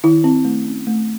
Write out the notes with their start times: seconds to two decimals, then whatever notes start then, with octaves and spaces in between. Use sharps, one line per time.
0.04 D#3 E4
0.24 C4
0.45 A3
0.66 C#4
0.87 A3